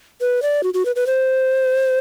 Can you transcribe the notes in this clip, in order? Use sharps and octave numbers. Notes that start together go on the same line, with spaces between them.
B4
D5
F#4
F#4
B4
B4
C5